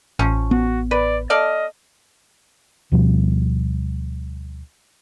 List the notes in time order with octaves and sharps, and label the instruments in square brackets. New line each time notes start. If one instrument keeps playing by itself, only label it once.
[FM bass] A1 [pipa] F3 C#4
[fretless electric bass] B3 [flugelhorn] F#4
[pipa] B4 [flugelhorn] D5
[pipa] A4 D5 F5 [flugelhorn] D#5
[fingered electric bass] D2 B2 F3 G3